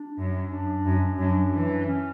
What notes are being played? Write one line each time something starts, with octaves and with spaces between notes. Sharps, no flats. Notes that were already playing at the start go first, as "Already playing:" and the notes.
Already playing: D4
F#2
D4
F#2
F#2 D4
E3
C#4